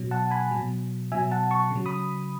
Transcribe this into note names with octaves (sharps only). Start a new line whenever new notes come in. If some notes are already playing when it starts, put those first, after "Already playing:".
Already playing: B2 F#3
F#5 A5
G#5 B5
B2 F#3
B2 F#3 E5 G#5
F#5 A5
A5 C#6
C#3 F#3
B5 D#6